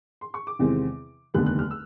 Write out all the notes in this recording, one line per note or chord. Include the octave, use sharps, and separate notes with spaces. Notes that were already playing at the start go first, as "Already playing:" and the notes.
C6
C#6
D6
E2 C3 D#3 G#3 C4
F1 D#2 D3 G3 B3 F#6
F#6
F6
E6